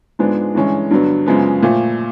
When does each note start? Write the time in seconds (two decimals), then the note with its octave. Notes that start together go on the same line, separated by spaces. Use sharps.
0.19 G#2 F3 G#3 B3 D4
0.55 G2 E3 G#3 C#4
0.91 G2 D3 F#3 B3
1.26 F#2 C#3 F3 G#3 B3
1.62 A#2 F3 A3